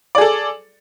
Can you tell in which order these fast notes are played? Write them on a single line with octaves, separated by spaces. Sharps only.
D5 G#4 A4